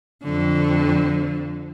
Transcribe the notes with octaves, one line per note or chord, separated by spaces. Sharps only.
F2 D3